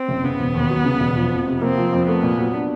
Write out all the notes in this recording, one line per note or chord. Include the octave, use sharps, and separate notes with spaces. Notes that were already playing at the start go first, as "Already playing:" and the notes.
Already playing: C4
F#1
C#3 B3
E1
D#2
F#3
C#3
E1
F3
F2
C3
A#3 C4
F3
F2
A3 B3
A#2
F#3
D4